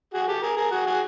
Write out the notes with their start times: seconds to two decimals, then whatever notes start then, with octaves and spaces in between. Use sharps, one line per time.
0.14 F#4 G#4
0.27 G4 A4
0.42 G#4 A#4
0.57 G#4 A#4
0.71 F#4 G#4
0.86 F#4 G#4